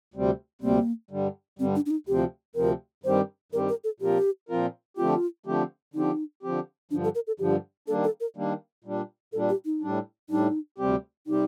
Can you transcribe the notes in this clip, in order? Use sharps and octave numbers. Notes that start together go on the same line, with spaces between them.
D2 C3 G3 C4
D2 C3 G3 A#3 C4
G2 D3 G3
G2 D3 G3 C4
D4
D4
D#4
D2 C3 F3 C4 G4
D2 C3 F3 C4 A#4
G2 D#3 G3 C4 G4 C5
G2 D#3 G3 C4 G4 A#4
A#4
A4
A#2 F3 C4 F4 G4 A#4
A#2 F3 C4 F4 A#4
D3 F3 A3 C4 F4 G4
D3 F3 A3 C4 G4
D3 F3 C4 D#4 G4
D3 F3 C4 G4
G2 D3 F3 D4
A4
A#4
A4
G2 D3 F3 G4
D#3 G3 A#3 D4 A4
A4
A#4
D#3 G3 A#3 D4
A#2 G3 D4
A#2 G3 D4 A4
G4
D#4
A2 G3 D4
A2 G3 D4 D#4
D2 C3 G3 C4 G4
C3 G3 C4 D#4 G4